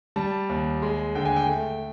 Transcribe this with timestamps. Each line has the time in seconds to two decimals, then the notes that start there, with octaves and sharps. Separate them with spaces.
0.16 G3 A5
0.49 D#2
0.82 G#3
1.15 D3 G5
1.25 G#5
1.36 G5
1.48 A3